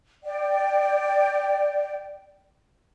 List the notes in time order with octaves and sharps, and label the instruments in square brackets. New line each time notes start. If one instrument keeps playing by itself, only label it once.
[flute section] D5 G5